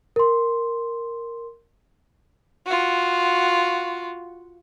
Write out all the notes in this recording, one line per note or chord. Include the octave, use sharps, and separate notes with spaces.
A#4 C6
F4 F#4